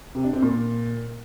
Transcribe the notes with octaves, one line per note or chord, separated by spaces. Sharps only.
C3
D4
C4
A#2